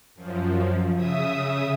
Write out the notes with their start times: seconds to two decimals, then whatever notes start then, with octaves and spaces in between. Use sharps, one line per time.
0.15 F#2 F3
0.95 C#3 E5 D#6